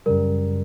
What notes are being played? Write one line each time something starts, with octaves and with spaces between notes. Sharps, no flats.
F#2 C#3 G3 A#4